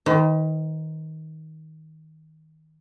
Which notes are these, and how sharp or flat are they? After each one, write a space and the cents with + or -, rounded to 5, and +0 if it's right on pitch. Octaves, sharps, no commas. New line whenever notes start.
D#3 +20 C5 -45